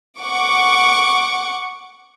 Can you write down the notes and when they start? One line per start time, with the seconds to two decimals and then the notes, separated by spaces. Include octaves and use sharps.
0.21 F#5 C#6 D6